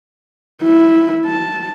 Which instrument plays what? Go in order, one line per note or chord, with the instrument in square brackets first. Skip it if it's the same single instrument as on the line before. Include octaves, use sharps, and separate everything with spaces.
[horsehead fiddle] E4
A5